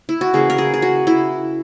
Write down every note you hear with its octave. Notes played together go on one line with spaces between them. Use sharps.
E4
F#4
C#3 E3 A#3 G#4
A#4
G#4
G#4
F#4
E4